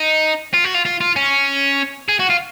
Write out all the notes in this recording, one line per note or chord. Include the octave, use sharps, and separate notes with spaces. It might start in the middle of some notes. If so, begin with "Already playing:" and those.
Already playing: D#4
F4
F#4
F4
F4
F4
C#4
G#4
F#4
F4